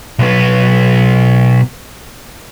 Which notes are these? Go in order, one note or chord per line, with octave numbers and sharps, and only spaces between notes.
B1 B3